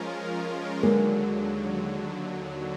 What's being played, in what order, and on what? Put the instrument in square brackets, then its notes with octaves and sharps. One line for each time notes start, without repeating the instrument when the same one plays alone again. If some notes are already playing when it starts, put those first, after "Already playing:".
Already playing: [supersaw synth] F3 G#3 C#4 F4 A#4
[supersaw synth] D#2 D3 F#3 [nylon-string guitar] G#3 A#3